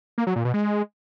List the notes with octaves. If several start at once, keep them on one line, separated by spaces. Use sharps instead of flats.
A#3
F#3
A#2
B2
G#3